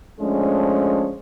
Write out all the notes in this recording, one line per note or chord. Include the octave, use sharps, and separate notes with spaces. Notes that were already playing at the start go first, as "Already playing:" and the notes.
F3 G#3 A3 C#4 D4